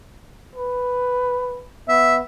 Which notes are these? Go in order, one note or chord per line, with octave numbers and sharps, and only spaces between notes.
B4
B3 E5